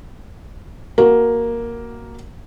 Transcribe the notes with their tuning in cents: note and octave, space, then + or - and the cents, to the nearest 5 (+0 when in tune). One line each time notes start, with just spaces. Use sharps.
A#3 +0 F#4 +0